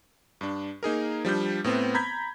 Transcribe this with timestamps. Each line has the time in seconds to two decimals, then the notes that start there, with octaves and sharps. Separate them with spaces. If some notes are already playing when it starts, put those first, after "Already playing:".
0.41 G2 D4
0.83 A#3 D#4 G#4 A#4
1.25 F3 G3 D4 G6
1.64 A2 B3 C4
1.95 A#5 B5 G6 G#6 B6